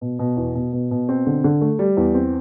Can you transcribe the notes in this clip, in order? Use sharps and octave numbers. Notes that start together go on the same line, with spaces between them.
B2
B2
E2
B2
B2
B2
C4
D3
D3
A3
G3
E2
C4